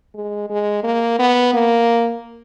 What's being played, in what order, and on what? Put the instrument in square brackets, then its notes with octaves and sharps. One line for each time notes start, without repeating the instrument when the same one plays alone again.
[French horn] G#3
G#3
A#3
B3
A#3